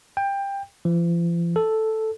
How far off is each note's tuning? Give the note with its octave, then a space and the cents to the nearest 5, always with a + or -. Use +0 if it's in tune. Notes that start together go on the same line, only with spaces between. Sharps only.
G5 +20
F3 -45
A4 +0